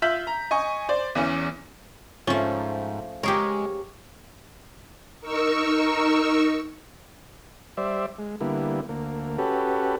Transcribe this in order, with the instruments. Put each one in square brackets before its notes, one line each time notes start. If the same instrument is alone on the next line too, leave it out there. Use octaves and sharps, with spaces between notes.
[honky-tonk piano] F4 E5 E6 G6 B6 F#7
A#5
D#5 G#5 C#6
C5 D5
E2 E3 C#4
[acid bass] G#2 [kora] F3 [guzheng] A3 C#4
[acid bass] G#3 [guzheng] G4 G#4 A#4 [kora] C#5
[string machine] D#4 A#4 C#6 E6
[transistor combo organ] G3 C5 D5 E5
G#3
D3 G3 A#3 B3 E4
D2 A#3
C#4 F#4 G4 A4 B4